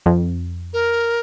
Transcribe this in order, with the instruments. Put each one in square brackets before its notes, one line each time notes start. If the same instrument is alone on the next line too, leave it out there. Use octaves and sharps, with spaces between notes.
[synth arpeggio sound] F2
[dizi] A#4